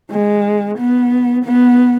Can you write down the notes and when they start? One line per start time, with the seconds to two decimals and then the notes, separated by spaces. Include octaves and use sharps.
0.11 G#3
0.78 B3
1.44 B3